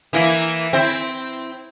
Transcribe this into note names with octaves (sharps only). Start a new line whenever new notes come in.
E3 A#3 E4
C4 E4